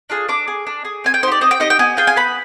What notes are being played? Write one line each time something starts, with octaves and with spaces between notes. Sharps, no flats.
D4 F4 G#4
D4 D6
G#4
D4
G#4
C4 G#5
G5
D#4 C5
G4 D5
C4 D#5
G5
D#4 G4 D#5
G5
B3 G#5
F4 G#4 G5
G#5
B3 B5